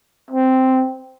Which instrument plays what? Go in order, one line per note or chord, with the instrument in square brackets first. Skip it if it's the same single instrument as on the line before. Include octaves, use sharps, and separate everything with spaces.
[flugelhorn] C4